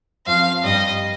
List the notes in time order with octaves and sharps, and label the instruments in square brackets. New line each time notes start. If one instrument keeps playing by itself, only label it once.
[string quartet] F2 F3 [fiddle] F5
[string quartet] G2 G3 [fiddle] D#5